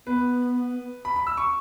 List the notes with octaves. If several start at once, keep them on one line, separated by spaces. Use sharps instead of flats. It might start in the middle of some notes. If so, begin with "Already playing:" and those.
B3 B4
B5
B5
E6
C#6